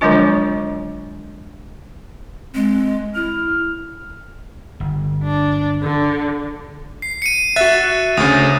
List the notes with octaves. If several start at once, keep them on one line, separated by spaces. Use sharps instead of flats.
D3 F3 F#3 G#3 D4 F4
G#3 C4
E4 F6
G1
D4
D3
C7
C#7 D#7
F#4 E5 F#6 A6
D2 C#3 D#6